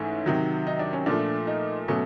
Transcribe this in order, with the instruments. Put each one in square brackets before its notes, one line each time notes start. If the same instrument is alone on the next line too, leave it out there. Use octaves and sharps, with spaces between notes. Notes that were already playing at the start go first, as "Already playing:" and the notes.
Already playing: [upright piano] G#2 E3 A3 C#4
C3 D#3 F#3
D#4
D4
C#4
A#2 F3 A3 D4
D#4
B2 F#3 A3 C#4